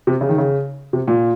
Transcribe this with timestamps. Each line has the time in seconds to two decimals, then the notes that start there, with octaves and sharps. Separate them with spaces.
0.07 C3
0.21 C#3
0.29 D#3
0.38 C#3
0.93 C3
1.08 A#2